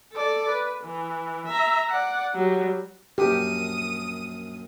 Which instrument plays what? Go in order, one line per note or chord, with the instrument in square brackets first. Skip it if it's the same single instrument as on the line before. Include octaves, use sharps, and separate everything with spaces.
[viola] A4 D5
B4
E3
E5 A#5
D5 F#5
F#3 G3
[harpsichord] A#1 F#2 [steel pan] G4 [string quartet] D#6